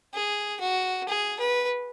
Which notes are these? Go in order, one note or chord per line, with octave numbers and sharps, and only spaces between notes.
G#4
F#4
G#4
B4